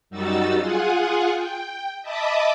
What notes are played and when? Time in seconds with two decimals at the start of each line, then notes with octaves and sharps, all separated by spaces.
0.10 F#2 G3 D#4 F#4 E6 A6
0.58 F4 G#4 F#5 G#5
1.32 G5
2.02 D#5 E5 A5 B5 D6 D#6